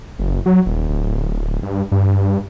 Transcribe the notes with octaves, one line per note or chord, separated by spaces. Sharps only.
F#1
F#3
D#1
D1
G2
G2